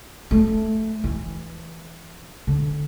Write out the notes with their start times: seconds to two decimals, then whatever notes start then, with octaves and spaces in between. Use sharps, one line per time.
0.31 A3
1.04 E3
2.47 D3